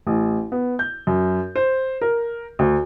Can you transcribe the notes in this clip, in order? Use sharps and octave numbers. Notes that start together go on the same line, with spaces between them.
A1
B3
G6
F#2
C5
A#4
D2